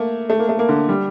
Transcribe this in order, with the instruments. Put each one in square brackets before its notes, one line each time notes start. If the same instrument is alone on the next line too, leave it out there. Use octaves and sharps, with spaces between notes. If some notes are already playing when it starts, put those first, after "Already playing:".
Already playing: [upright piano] A3 A#3
A3
A#3
A3
A#3
D3
G3